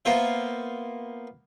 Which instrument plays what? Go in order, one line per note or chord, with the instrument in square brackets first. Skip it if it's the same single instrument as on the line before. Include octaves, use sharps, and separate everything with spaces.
[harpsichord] A#3 B3 F4 C5 E5